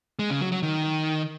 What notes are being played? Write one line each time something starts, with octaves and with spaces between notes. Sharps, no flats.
G#3
C#3
F#3
F#3
D#3